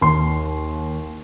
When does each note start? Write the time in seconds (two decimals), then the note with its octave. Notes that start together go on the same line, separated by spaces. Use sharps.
0.01 D#2 C6